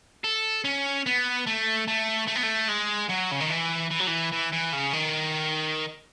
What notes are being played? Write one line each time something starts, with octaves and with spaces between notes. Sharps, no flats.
A4
C#4
B3
A3
A3
A3
B3
A3
G#3
F#3
C#3
D#3
E3
E3
F#3
E3
E3
E3
C#3
D#3